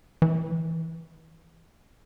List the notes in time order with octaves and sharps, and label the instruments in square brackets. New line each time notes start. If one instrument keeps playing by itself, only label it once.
[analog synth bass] E3